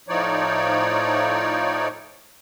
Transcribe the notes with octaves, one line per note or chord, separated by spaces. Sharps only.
A2 F3 D#4 C#5 D5